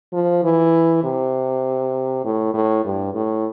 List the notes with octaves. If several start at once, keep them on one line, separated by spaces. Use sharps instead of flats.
F3
E3
C3
A2
A2
G2
A2